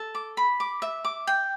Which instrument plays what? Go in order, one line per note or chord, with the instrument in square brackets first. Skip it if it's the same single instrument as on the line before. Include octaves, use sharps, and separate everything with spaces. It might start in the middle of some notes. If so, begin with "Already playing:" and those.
Already playing: [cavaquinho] A4
D6
B5
D6
E5
D6
G5